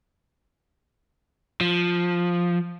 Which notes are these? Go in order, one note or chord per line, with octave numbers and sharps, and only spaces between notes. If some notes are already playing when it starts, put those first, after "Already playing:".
F3